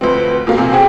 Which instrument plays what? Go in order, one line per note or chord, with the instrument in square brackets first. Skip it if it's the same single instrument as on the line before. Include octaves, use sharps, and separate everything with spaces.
[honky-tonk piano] D2 F3 C4 [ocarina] B4
[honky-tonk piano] F2 B2 A#3
[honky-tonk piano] C3 F3 [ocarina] G#5
[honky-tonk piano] C4 F#4 G#4 [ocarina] G5